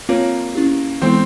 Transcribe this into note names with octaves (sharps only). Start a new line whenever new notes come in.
A#3 C4 F4 A#4 C#5
C#4 E4 G4
E3 G#3 B3 C4 E4 A4